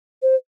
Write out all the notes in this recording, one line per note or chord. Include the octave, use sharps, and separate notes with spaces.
C5